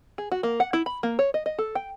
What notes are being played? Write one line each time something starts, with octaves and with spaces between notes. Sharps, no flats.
G#4
F#4
A#3
F#5
E4
B5
A#3
C#5
D#5
D#5
A4
G5